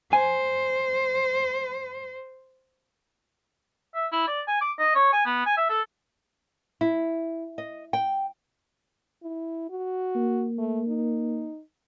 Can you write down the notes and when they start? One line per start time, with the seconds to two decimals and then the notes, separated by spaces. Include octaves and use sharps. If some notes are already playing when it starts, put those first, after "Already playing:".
0.13 C5 G#5
3.95 E5
4.12 E4
4.27 D5
4.47 G#5
4.61 D6
4.79 D#5
4.95 C#5
5.12 G#5
5.25 B3
5.46 G#5
5.57 E5
5.70 A4
6.81 E4
7.58 D#5
7.93 G5
9.23 E4
9.70 F#4
10.16 A#3
10.58 A3
10.88 D#4